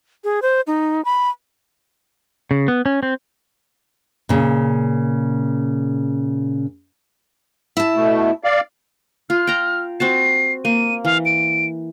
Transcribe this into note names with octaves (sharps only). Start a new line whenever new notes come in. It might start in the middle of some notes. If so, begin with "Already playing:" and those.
G#4
C5
D#4
B5
C#3
B3
C#4
C4
A#2 C#3
E4 A5
B2 A3
D5 F5
F4 F6
G5 A#5
C4 F#4 A5 C7
A#3 D#7
E3 F5
D7